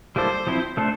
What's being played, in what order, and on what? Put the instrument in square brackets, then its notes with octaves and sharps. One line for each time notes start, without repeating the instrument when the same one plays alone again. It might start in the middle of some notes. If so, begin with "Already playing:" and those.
[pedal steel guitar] G3 A#3 E4 A4 D5 [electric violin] C5
[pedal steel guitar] F3 C4 E4
A3 D4 A4 C5